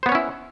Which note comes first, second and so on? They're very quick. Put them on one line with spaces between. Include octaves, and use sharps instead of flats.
C5 B3 C#5 C#4 E4